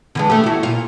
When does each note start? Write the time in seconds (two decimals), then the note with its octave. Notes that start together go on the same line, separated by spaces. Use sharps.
0.15 D3 E3 G#3
0.30 A3 G4
0.43 E4 F#4
0.63 A#2 F4